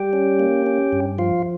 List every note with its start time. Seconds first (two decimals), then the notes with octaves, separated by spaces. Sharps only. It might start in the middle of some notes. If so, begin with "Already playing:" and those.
Already playing: G3 G4 G5
0.13 C#4
0.39 A#3
0.66 C#4
0.93 G2
1.18 F3 F4 F5